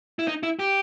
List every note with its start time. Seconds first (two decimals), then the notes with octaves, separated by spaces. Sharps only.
0.19 E4
0.28 D#4
0.43 E4
0.59 G4